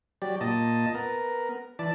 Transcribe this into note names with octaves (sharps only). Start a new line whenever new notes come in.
F#3 G4 D5
A#2 D#5 A5
B3 A#4
E3 D5 A5